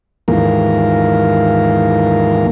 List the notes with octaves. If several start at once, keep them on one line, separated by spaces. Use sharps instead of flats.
D#2 G#2 E3 A#3 F4 A#4